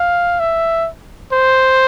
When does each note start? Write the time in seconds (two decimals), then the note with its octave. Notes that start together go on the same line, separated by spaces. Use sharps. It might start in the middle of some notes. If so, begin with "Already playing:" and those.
Already playing: F5
0.40 E5
1.33 C5